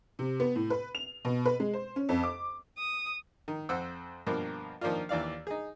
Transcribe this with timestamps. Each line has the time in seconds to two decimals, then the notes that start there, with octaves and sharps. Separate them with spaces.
0.19 C3
0.40 B3
0.56 A2
0.70 B4
0.95 F7
1.25 B2
1.45 B4
1.60 G#3
1.73 C5
1.96 C#4
2.09 F2
2.23 D6
2.78 D#6
3.48 D#3
3.69 F2 C5 F#5 E6
4.27 G2 B2 F3 A#3 A#4
4.81 D#3 F3 A#3 D4 F4
5.09 D#2 E3 D5 F5
5.47 D#4 G#4